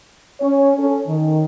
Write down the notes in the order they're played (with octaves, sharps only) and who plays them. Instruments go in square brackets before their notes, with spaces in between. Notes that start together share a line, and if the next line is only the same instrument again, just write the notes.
[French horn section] C#4 C#5
C#4 A4
D#3